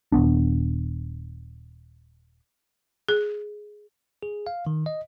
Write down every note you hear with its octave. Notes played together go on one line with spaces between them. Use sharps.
D#1 G#2 B3 D4
G#4
G#4
F5
D#3
D#5